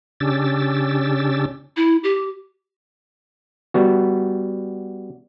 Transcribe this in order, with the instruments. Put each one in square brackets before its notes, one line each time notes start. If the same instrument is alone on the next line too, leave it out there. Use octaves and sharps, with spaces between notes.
[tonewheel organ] C#3 C#4 D4 G4 E6 A6
[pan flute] E4
G4
[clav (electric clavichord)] G3 B3 F#4